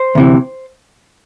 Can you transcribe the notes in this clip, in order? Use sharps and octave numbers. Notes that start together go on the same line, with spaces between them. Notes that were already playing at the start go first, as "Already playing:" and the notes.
Already playing: C5
D2 C3 E3